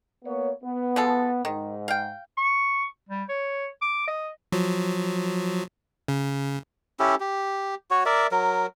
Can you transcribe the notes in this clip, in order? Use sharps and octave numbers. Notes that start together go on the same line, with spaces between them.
A#3 B3 C#5
B3
F3 G#3 A4
G#2 D#3
F5 G5
C#6
G3
C#5
D6
D#5
F3 F#3
C#3
C#4 E4 G4 A4
G4
F#4 C#5
A#4 D5 E5
F#3 A#4